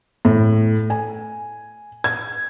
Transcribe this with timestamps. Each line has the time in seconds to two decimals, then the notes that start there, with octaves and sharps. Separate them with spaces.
0.25 A2
0.90 G#5
2.04 G#6